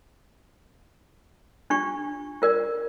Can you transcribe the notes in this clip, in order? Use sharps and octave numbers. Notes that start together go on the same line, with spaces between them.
D4 F4 G4 C#6
F4 A#4 D5